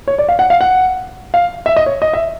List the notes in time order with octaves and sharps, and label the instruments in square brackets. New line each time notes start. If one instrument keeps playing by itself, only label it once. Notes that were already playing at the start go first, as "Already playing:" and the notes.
[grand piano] C#5
D5
F5
F#5
F5
F#5
F5
E5
D#5
C#5
D#5
E5